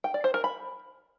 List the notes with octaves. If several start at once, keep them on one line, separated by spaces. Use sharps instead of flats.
G5
D5
C5
A#4
B5